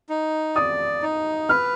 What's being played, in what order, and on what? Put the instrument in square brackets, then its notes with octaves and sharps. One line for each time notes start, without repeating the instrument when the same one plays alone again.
[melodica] D#4
[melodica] D5 [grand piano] D#6
[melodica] D#4
[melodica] B4 [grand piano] F6